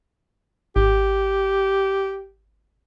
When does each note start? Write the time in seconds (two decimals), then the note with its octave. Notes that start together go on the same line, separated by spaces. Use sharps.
0.76 G#1 G4